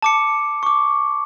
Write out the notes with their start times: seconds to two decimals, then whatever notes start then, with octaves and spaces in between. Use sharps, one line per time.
0.02 A5 D6 C#7
0.63 C#6 D6